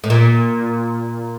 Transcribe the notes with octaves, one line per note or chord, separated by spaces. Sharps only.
A2
A#2